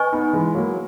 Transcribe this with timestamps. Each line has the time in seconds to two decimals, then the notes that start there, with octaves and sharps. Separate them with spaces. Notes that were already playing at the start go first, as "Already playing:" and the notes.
Already playing: B4 D#5 G#5 C#6
0.13 B3 D#4
0.33 E3 G#3
0.55 F#3 A#3